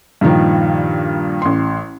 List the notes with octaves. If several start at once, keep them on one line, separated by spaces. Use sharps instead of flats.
G2 A#2 D#3 F3
A1 C6